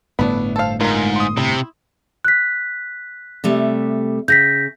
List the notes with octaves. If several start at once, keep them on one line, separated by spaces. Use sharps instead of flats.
G1 A2 A3 B3 D4 E4 B5
A4 C5 F5 A5
G#2 D#4 F4 A#4
C6 D#6
C3 E4
F#6 B6
C3 G3 A3
C#3 G6 A#6 B6